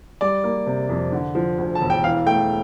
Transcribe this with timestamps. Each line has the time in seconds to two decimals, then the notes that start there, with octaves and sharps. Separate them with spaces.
0.21 G3 D5
0.44 A#3
0.67 C3
0.89 F2
1.12 D3
1.35 F3
1.58 D2
1.75 A5
1.81 E1
1.90 G5
2.03 E3 F5
2.26 A3 G5